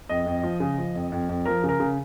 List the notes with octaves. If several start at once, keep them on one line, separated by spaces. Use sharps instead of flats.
F2 D#5
F2
F3
C#3
F3
F2
F2
F2
F3 A#4
C#3
A#4
C#3